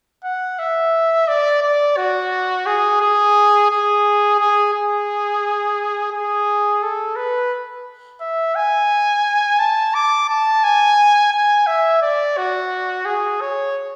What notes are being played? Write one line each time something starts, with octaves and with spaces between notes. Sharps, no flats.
F#5
E5
D5
D5
F#4
G#4
G#4
G#4
G#4
G#4
G#4
A4
B4
E5
G#5
A5
D6
A5
G#5
G#5
E5
D5
F#4
G#4
C#5